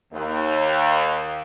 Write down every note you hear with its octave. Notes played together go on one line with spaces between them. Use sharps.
D#2